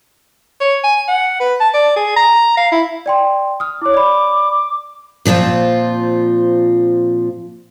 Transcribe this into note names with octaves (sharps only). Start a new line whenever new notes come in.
C#5
G#5
F#5
B4
A5
D5
G#4
A#5
F5
E4
D5 G5 C6
D#6 F6
E4 C#5 D6
D5 B5
A#2 F3 C4 F4